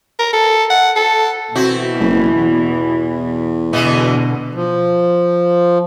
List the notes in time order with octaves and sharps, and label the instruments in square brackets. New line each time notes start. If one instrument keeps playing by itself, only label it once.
[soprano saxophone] A#4
A4
F#5
A4
[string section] B2 E3 [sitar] C4 E4 F#4
[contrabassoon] F#1
E2
[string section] B2 D3 [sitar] E3 G#3 B3
[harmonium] F3